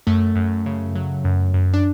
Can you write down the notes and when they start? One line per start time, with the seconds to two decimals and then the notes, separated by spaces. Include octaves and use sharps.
0.07 F#2 A3
0.36 F#2
0.66 C#3
0.95 F#3
1.24 F#2
1.54 F#2
1.73 D4